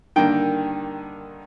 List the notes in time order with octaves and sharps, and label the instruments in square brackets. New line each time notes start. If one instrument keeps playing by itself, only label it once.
[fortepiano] G2 D3 D#3 [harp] A#3 G5